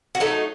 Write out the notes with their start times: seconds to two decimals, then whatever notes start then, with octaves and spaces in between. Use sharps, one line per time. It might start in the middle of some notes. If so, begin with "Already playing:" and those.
0.15 F#4
0.20 F#3 A3 D#4 A4